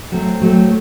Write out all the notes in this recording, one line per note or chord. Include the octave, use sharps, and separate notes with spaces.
F#3 A3 C4
F#3 A3 C4